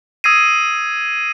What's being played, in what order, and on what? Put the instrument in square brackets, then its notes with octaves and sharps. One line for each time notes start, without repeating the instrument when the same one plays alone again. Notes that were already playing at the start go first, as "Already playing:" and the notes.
[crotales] D#6 E6 G#6 A#6 C7 D#7